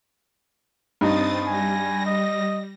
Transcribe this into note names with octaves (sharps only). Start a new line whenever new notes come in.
G2 C4 D#4 D#6 A6
G3 G#5 A#6
D#5